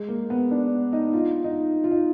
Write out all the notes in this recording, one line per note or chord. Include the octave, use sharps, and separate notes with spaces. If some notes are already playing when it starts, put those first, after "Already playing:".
Already playing: G#3
A#3
B3
D4
D#4
F4
D#4
F4
D#4